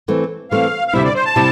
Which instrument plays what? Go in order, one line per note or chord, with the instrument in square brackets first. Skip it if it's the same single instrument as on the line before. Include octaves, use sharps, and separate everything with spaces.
[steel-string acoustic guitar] E3 A3 C4
[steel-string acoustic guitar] E3 A3 C4 [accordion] F5
[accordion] F5
[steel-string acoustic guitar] D2 C3 G3 C4 E4 [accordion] E5
[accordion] D5
C5
A5
[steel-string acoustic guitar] C3 G3 C4 E4